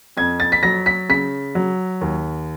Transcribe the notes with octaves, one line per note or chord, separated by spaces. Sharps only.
F2 G#6
A6
B6
F#3 A#6
B6
C#3 B6
F#3
D#2